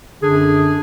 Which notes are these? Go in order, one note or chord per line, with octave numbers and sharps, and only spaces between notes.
F#2 D3 D4 G#4